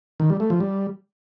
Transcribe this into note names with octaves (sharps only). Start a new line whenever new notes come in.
D#3
G3
A3
F3
G3